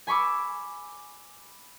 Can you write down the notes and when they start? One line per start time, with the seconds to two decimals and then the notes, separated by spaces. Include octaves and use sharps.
0.07 G#5 B5 C#6 D6 E6